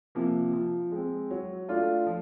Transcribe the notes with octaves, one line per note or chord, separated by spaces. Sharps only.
C3 F3 A#3
F3
G#3 C4
F#3
A3 D4 F4
F3